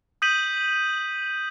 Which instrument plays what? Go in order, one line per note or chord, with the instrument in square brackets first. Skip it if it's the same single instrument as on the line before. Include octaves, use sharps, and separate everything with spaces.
[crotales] D#6 G6 B6 D#7 F#7